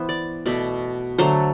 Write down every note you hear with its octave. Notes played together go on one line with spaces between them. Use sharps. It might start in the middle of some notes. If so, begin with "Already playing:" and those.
Already playing: E3 B3 C5
D5
B2 A3 D5
D3 F#3 A3 C5